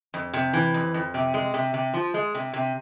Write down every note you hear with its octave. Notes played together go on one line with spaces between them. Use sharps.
F2
C3
E3
F2
F2
C3
G#3
C3
C3
F3
G#3
C3
C3